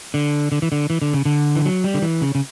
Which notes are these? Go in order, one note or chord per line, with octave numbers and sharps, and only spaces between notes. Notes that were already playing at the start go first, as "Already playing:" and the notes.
D3
D3
E3
D3
E3
D3
C#3
D3
E3
F#3
G3
D3
E3
C#3
C#3